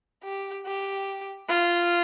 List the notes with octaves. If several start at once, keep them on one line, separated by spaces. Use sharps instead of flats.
G4
G4
F4